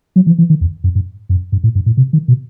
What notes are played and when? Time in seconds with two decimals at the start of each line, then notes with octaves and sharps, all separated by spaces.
0.16 F#3
0.27 E3
0.38 E3
0.50 D#3
0.61 E2
0.84 F#2
0.95 G2
1.29 F#2
1.52 G2
1.64 A2
1.75 G2
1.86 A2
1.97 C3
2.13 D#3
2.28 B2